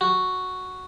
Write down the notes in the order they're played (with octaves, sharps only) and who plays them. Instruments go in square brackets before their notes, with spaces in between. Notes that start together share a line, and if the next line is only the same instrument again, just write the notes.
[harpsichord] F#4